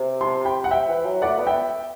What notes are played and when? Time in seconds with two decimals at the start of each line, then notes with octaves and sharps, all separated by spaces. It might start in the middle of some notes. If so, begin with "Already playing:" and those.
Already playing: C3
0.21 A5 C6
0.45 G5 B5
0.64 F#5
0.71 E5 G5
0.88 E3
1.05 F#3
1.22 A3 D5 F#5
1.39 B3
1.47 E5 G5